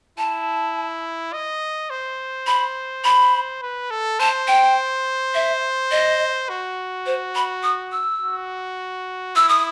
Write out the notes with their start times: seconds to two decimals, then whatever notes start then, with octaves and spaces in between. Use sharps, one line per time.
0.18 E4 A5
1.33 D#5
1.90 C5
2.47 B5
3.05 B5
3.62 B4
3.91 A4
4.20 C5 A5
4.48 G5
5.34 E5
5.91 D#5
6.49 F#4
7.06 C5
7.35 B5
7.63 D#6
7.92 E6
8.21 F#4
9.36 E4 E6
9.49 D#6